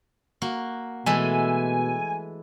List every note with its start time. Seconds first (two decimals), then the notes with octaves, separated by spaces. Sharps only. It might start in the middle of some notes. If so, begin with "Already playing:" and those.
0.42 A#3 F#4
1.06 B2 E3 G#3 A3 G#5